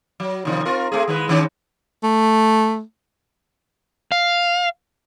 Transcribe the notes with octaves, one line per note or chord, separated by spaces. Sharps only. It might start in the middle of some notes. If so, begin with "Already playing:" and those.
F#3
D#2 C3 F3
C4 F4 A#4
A3 C4 G#4
D#3 G#3 B4
G#2 D#3 C#4
A3
F5